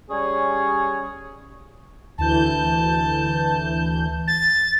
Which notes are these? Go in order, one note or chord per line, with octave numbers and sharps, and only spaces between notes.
G3 C#4 G#4 C#5
D2 E3 A5 G6
A6